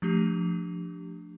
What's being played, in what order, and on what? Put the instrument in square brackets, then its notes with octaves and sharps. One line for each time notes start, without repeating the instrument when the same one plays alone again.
[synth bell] F3 A3 D4 G4